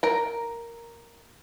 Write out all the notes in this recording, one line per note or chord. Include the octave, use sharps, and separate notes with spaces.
A#4 A#5